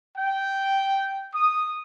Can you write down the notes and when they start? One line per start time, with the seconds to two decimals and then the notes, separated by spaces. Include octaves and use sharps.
0.16 G5
1.33 D#6